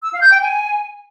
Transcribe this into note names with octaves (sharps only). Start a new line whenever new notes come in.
E6
F5
G6
G5
G#5